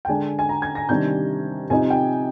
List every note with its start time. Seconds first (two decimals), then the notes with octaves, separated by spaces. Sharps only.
0.05 G5
0.08 D3 G#3 D4 G#5
0.39 G#5
0.49 A#5
0.62 G#6
0.75 A#6
0.89 C3 D#3 G3 D4 G6
1.70 C3 F3 C4 D#4 G#5
1.90 G5